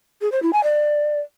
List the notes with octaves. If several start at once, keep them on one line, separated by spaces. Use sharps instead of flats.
G#4
C5
E4
G#5
D5